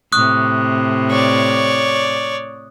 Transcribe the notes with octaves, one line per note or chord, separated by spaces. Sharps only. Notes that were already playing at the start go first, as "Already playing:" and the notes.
A2 C3 C#6 D#6 F#6
C#5 D5